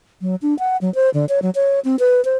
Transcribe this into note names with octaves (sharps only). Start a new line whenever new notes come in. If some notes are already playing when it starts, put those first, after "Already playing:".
F#3
D4
F#5
F#3
C5
D3
C#5
F#3
C#5
C4
B4
C5